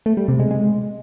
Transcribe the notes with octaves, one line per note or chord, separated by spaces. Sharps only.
A3
G3
C3
G#3
G#3